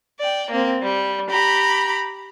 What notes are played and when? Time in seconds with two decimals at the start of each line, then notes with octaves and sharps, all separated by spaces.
0.20 D5 G5
0.51 A#3 C4
0.82 G3
1.30 G4 A#5 B5